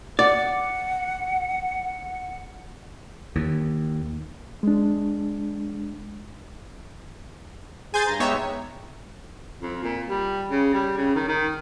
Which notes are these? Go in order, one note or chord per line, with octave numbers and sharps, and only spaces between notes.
D5 F#5
D#2
G#3 D4
G#4 C5 G#5 G6 A6
G2 A#5
G#3 B3 D#4 G4 C#5 E5
F2
A#2
G3
C#3
G3
C#3
D#3
D#3